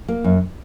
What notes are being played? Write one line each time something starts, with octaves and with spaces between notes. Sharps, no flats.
A#3
F#2